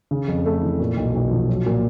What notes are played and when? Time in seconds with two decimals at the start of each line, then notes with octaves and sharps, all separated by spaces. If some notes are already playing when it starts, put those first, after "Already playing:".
0.11 C#3
0.28 F2
0.45 A3
0.62 E3
0.80 A#2
0.97 B1
1.14 B1
1.31 F3
1.48 F#3
1.66 A#2